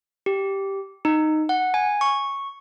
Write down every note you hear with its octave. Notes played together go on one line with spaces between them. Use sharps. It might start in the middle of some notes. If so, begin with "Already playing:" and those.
G4
D#4
F#5
G#5
C#6